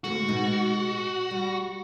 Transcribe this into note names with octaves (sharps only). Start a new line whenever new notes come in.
D2 G#3 F#4 A4
B2 G#3 D#4
G3